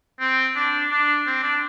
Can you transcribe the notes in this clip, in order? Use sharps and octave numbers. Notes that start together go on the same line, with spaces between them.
C4
D4
D4
C4
D4